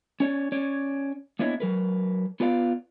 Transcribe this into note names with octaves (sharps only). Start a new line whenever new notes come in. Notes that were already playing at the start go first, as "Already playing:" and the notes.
C#4 C#5 D5
C#4 C#5 D5
A#3 B3 D4 E4 C#5 D#5
F#3 A#4 B4
B3 F4 B4 D5 F5